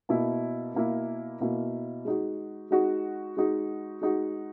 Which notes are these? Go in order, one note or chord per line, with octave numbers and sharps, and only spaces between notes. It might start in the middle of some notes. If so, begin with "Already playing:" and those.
B2 A#3 E4
B2 A#3 E4
B2 A#3 E4
G#3 D#4 F#4
G#3 D#4 F#4
G#3 D#4 F#4
G#3 D#4 F#4